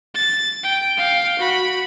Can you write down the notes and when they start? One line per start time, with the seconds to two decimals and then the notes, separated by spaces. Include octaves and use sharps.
0.15 A6
0.63 G5
0.97 F5 G5
1.39 F#4 B5